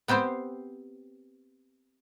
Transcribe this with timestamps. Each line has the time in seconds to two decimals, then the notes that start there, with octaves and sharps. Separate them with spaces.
0.08 B3 C4 G4 C5